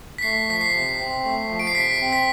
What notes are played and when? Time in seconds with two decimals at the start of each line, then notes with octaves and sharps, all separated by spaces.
0.18 B6
0.22 A3 C7
0.48 F3 B6
0.61 C7
0.74 C3
0.99 C4
1.24 A3
1.50 F3
1.59 D7
1.67 C7
1.75 C3 B6
2.01 C4
2.13 B6